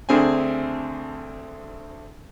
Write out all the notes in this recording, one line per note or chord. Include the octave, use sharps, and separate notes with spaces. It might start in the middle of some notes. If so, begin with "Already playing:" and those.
D2 D3 C4 G#4 G#5